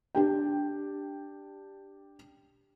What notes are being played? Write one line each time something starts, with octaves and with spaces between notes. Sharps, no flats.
D4 G4 G5